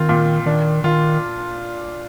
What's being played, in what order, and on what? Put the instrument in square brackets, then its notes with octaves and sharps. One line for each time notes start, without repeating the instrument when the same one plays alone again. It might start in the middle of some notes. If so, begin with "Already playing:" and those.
Already playing: [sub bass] D#3 [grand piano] C4 F4
[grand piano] A#2
[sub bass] D#3 [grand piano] D4
[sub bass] D#3 [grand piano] F4